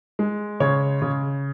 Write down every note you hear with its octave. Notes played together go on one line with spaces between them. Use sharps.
G#3
C#3 C#5
C#3